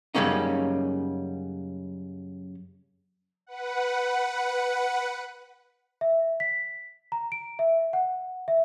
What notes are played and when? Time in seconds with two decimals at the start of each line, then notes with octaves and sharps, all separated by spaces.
0.15 F#2 C#3 G3 A#3 C#4 D#4
3.47 B4 F#5
6.01 E5
6.40 B6
7.12 A#5
7.32 D7
7.59 E5
7.93 F#5
8.48 E5